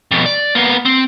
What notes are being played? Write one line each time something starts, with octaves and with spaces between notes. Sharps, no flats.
F2 B2
D5
A#3 B3
C4